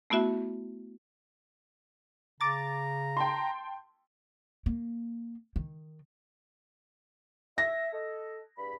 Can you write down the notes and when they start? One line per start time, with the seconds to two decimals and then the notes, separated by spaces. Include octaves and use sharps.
0.10 A3 B3 E4 F#4 E5
2.41 C#3 A#5 D6 A6
3.17 G5 A5 C6
4.66 A#3
5.56 D#3
7.58 E5 A#6
7.93 A4 D#5
8.58 E2 G2 B5